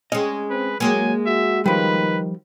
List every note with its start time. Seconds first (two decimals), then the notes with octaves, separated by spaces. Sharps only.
0.12 G#3 C#4 D#5
0.50 C4 B4
0.80 F#3 G#3 A#3 G#5
1.26 F#4 E5
1.66 D#3 F3 G3 B4